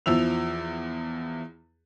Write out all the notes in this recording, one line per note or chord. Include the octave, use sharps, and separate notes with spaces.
E2 F3 E4 E6 F7